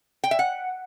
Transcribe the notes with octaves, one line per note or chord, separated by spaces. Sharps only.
G5
E5
F#5